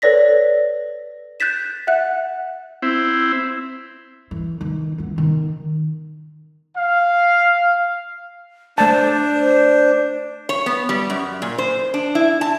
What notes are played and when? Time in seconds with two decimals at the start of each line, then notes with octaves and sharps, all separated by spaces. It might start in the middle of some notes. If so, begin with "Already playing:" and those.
0.02 A4 B4 C#5 D5 A#6 B6
1.40 F#6 G6 A6 B6 E7
1.87 E5 F#5 F#6
2.82 C4 E4
4.31 E3
4.61 D#3
4.98 E3 B3
5.18 D#3
6.78 F5
8.78 A3 D4 C5 A5
10.49 C#5
10.66 B3
10.89 G3
11.10 F#2
11.42 A#2
11.58 C5
11.94 D4
12.15 E4
12.41 A5